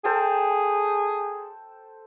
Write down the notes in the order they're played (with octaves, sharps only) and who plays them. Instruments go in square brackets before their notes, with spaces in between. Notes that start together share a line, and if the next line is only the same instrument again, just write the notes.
[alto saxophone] G#4 [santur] A4 C5 G5